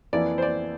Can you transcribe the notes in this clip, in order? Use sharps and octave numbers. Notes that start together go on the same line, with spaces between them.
F2 E3 A#3 E4 D5
C5
D5